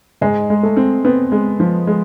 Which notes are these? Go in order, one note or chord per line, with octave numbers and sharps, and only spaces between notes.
G#2 G#3
G#3
A3
C4
B3 C4
G#3
F3
G#3